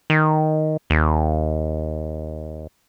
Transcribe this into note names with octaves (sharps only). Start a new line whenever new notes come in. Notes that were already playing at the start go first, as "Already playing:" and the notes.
D#3
D#2